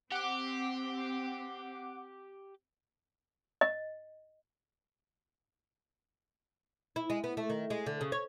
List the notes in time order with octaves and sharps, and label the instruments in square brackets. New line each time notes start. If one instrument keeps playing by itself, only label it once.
[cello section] C4 [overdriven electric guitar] G4 [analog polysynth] F#5 D6
[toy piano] D#5
[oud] E4
G#3
B3
A3
D#3
G#3
D3
C#3
C#5